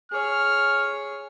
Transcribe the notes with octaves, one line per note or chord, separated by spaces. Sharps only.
G#4 C#5 F6